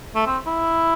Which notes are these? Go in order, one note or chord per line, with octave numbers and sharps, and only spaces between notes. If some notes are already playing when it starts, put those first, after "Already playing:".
A3
C4
E4